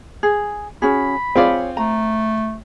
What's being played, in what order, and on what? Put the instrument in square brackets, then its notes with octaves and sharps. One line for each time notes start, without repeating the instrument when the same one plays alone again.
[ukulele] G#4
[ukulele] C#4 F#4 G#4 [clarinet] B5
[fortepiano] C4 F4 D5 [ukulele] G#4 C#5
[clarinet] A3 [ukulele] A#5